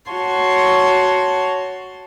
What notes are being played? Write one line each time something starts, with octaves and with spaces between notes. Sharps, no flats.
F#4 C#5 A5 C6